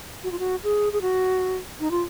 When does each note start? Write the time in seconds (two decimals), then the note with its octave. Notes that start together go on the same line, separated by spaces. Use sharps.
0.24 F#4
0.32 F4
0.39 F#4
0.64 G#4
0.93 G#4
1.02 F#4
1.80 D#4
1.91 F4